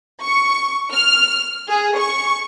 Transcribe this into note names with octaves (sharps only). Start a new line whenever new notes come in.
C#6
F6
G#4
C#6